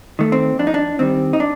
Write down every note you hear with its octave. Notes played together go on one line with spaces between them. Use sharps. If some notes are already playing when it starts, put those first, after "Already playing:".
D#3 A3
C4
F2 D4
D#4
D4
D#3 G3 C4
D#4
D4